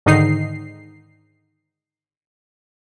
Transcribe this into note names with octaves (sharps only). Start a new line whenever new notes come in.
G#2 D3 D#3 D#4 C7